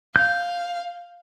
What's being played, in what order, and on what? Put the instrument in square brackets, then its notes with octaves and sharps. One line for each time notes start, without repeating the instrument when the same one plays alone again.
[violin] F5 [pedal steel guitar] G6